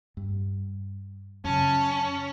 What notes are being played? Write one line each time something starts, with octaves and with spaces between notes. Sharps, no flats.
G2
F#2 C#3 C#4 A5